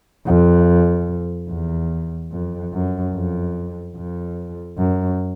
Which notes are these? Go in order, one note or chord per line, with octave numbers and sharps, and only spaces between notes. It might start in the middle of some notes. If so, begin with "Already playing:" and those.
F2
E2
F2
F#2
F2
F2
F#2